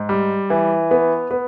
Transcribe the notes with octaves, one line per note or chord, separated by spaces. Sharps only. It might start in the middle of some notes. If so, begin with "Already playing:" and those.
Already playing: G#2
G3
E3
B3
B3